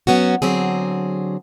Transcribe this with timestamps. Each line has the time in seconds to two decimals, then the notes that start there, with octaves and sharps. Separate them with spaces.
0.07 F#3 B3 C#4 F#4
0.42 D3 F#3 C4 G#4